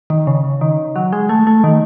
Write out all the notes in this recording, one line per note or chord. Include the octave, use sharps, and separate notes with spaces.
D#3
C#3
D#3
F#3
G#3
A3
A3
D#3